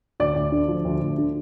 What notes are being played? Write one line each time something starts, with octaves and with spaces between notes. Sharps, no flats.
D2 D5
D2
D3
F3
D2
D2
D3